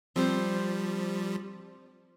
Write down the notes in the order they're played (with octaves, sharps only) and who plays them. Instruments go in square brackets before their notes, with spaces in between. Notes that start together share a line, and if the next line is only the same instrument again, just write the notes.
[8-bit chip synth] F3 G3 [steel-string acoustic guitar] C4 D4 C5